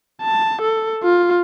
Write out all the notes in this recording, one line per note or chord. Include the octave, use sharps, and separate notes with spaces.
A5
A4
F4